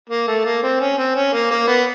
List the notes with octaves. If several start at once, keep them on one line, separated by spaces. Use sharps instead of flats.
A#3
A3
A#3
C4
C#4
C4
C#4
A#3
A#3
B3